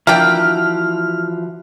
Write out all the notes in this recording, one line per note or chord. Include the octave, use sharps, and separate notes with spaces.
E3 F3 A#3 D4 F#4 E5 G5 F6